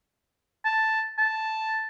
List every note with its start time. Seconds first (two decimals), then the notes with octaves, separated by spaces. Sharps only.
0.65 A5
1.18 A5